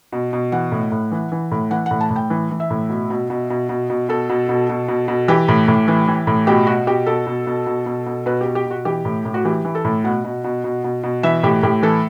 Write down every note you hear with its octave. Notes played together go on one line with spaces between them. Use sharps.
B2
B2
E3 F#5
A2
A2
E3
E3
A2
E3 F#5
A2 F#5
A5
A2
G5
E3
E3
E5
A2
B2
B2
B2
B2
B2
B2
B2 A4
B2
B2
B2
B2
B2
E3 G4
A2
A2
E3
E3
A2
B2 G4
B2 F#4
B2 G4
B2 A4
B2
B2
B2
B2
B2
B2 B4
B2 G4
G4
B2 F#4
E3 G4
A2
A2
F#4
E3 G4
E3
A4
A2
B2 F#5
B2
B2
B2
B2
B2
E3 E5
A2 G4
A2 G4
E3 A4